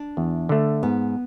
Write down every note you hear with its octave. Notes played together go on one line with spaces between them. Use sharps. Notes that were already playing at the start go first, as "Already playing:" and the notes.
Already playing: D4
E2
D3 A3
G#2 B3